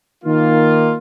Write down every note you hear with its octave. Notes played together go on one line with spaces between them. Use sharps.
D#3 A#3 F4